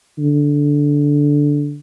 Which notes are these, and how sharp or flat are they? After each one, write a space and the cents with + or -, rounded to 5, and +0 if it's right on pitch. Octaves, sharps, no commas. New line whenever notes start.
D3 -10